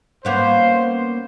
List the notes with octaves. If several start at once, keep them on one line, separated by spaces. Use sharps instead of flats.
A#3 B3 C#4 C5